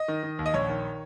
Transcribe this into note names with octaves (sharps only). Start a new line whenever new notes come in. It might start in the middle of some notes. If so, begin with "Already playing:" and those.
Already playing: D#5
D#3
D#3
D#2
D#5
A#1 C#5
D#3